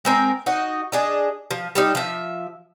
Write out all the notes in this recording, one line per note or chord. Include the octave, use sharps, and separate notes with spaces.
G#3 C4 A#4
D#4 F#4 D#5
D4 G#4 D#5
F3
G3 D4 D#4
F3 E5